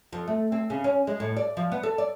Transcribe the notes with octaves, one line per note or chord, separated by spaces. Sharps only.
F2
A3
C4
C#3
C#4
G#3
A2
D5
F3
B3
A4
D5